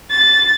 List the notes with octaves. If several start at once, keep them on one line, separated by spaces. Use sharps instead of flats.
A6